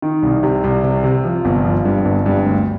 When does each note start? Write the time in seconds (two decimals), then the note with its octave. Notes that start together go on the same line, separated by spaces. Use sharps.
0.02 D#3
0.23 C2
0.43 C3
0.64 C2
0.84 C3
1.04 C3
1.24 F3
1.45 G1
1.65 F3
1.85 G2
2.05 G1
2.26 G2
2.46 D2